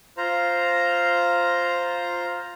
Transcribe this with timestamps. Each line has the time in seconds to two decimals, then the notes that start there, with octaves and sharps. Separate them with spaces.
0.17 F4 C5 A#5